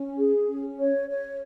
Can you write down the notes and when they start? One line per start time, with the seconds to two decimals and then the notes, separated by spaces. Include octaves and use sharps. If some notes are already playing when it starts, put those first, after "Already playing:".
Already playing: C#4
0.18 G#4
0.48 C#4
0.78 C#5
1.08 C#5